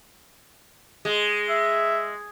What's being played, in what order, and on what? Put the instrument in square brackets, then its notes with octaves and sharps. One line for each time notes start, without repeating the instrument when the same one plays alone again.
[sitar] G#3
[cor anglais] E5